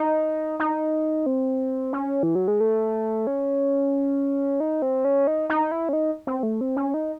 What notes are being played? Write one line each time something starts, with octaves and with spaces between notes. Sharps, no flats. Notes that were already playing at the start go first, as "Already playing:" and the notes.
Already playing: D#4
D#4
C4
C#4
E3
F#3
G#3
A3
C#4
D#4
C4
C#4
D#4
D#4
E4
C#4
D#4
C4
A3
C4
C#4
D#4